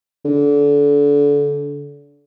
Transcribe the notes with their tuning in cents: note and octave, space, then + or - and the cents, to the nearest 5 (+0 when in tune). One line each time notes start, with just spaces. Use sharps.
D3 -30